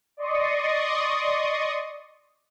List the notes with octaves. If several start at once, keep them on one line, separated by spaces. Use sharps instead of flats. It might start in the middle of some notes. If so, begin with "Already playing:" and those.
D5 D#5 C6 C#6 D#6